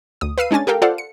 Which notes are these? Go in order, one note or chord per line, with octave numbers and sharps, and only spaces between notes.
D2 D#6
B4 F5 E6 C7 D#7
G#3 C#4 D4 G#5 A6
G4 A4 A#4 F5 G5
F4 A4 C5 D5 F5 F#5
C#7